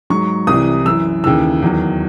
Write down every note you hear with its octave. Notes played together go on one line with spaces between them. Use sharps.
G#2 F#3 C#6
C2 C3 E3 D#6
F#2 E3 E6
D#2 C#3 E3 E6
E2 D#3 F#3